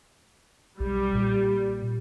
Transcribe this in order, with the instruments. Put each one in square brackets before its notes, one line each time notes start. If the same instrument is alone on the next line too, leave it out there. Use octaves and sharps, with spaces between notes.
[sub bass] B1 [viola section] G3
[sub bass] A#2